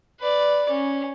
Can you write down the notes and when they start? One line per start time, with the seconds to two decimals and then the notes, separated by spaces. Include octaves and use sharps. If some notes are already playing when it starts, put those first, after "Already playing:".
0.20 B4 D5
0.69 C#4